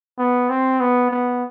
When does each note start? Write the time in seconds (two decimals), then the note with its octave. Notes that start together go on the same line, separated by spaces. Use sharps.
0.18 B3
0.50 C4
0.80 B3
1.11 B3